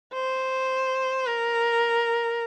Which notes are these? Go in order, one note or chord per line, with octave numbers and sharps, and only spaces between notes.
C5
A#4